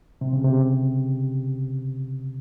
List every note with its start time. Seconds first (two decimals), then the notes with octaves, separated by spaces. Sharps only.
0.21 C3
0.33 C#3
0.44 C3